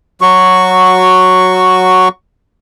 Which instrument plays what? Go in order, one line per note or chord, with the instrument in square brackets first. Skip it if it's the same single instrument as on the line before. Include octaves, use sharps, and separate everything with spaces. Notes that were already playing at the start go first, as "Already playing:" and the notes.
[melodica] F#3 F#4 C#6